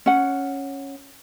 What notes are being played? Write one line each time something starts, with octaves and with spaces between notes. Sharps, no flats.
C#4 F#5